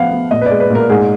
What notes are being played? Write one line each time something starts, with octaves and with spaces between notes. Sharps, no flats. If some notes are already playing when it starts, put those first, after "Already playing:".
Already playing: F3 B3 F5 F#5
B3
A#2 D#5
B4
G#3 D5
B4
A#2 A#4
G#2 G#4